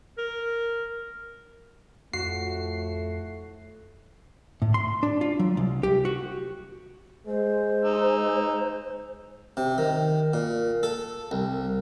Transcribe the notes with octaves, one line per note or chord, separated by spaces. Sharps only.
A#4
F2 A2 F3 A3 F#4 C7
A2
C6
D4
F4
F#3
C2
G4
F#4
G#3 C5
D#4 E6
C3
D#3
A#2
A4
C2